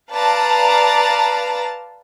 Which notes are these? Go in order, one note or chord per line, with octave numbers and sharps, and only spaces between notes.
B4 D5 F5 A5 A#5